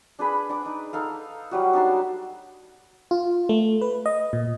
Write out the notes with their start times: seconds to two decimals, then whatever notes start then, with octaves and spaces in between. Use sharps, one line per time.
0.19 D4 G#4 B4 B5
0.49 D4 D6
0.66 D#4
0.93 D#4 A4 F5
1.51 F#3 G3 F#4
1.73 D4 D#4 A5 C6
3.11 F4
3.49 A3
3.82 B4
4.06 D#5
4.33 A#2